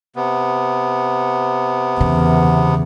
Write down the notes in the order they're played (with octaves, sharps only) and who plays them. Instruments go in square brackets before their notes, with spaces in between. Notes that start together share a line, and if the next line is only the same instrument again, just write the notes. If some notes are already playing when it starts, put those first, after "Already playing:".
[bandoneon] C3 B3
[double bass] E2 [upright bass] C#3